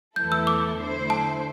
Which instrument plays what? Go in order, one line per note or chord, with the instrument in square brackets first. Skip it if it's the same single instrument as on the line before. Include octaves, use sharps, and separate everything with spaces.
[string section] E2 E3 A3 E4 A4 [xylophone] G6
[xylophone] E6
D6
[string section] D3 A3 E4 C5
[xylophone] A5